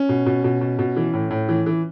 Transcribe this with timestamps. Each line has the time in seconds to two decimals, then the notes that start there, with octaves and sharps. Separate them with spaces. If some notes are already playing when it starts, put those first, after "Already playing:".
Already playing: C#4
0.09 B2
0.26 B2
0.44 B2
0.61 B2
0.79 B2
0.96 E3
1.14 A2
1.31 A2
1.49 E3
1.66 E3